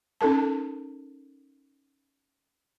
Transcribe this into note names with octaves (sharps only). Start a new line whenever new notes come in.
C#4 D#4 A4 A#4 A5